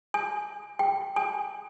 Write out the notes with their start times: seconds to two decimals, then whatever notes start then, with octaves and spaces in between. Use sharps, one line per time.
0.14 G#5
0.79 G5
1.16 G#5